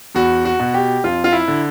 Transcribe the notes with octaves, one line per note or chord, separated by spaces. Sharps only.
E2 F#4
F#4
B2
G4
F2 F4
F4
E4
D3